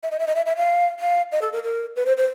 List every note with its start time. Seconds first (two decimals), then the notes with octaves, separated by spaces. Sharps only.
0.03 E5
0.11 D#5
0.19 E5
0.27 D#5
0.36 E5
0.46 E5
0.56 F5
1.00 F5
1.32 D#5
1.42 A4
1.53 A#4
1.64 A#4
1.96 B4
2.06 C5
2.17 C5